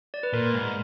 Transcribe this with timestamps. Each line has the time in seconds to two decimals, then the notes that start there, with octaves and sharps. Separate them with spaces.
0.14 D5
0.23 B4
0.33 A#2 A#4
0.53 G#2